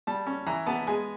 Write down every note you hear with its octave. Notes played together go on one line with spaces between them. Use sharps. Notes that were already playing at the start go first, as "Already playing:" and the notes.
G3 A5
C#4
E3 A#5
B3 A5
G#3 G#5